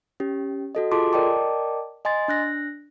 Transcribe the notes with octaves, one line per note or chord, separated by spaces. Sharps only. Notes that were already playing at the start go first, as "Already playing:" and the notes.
C#4 G4
F#4 A4 D#5
F4 G#4 A4 A5 C6 D6
A#4 D5 D#5 G5 A5 D6
D#5 G#5 C6 A6
D4 F#6 A#6